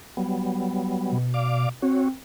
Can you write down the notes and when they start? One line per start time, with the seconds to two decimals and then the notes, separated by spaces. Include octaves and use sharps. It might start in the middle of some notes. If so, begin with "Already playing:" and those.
0.17 F#3 G3 B3
1.12 B2
1.34 D5 F5 D6
1.82 C4 F#4 C#5